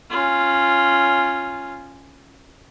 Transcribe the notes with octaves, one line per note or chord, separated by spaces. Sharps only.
C#4 F4